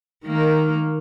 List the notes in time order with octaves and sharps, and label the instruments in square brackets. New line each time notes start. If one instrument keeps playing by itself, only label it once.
[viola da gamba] D#3 A#3